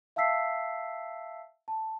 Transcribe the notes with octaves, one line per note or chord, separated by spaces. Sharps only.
E5 F5 A5 E6 B6 C7
A5